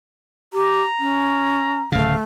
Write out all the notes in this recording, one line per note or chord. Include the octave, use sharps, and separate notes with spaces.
G4 A#5
C#4
D1 C#3 A3 F5